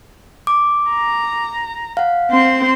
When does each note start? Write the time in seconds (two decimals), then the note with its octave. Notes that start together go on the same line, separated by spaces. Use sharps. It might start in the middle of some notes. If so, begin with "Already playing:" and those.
0.47 D6
0.91 A#5
1.97 F5 F#5
2.31 C4 C6